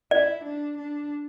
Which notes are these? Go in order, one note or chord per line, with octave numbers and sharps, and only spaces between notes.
E4 D5
D4
D4